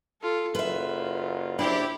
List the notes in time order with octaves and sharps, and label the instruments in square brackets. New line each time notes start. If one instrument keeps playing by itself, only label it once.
[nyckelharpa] F4 A4
[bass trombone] F#1 [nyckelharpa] F4 [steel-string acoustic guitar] B4 E5
[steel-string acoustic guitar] D4 C5 [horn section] E4 G4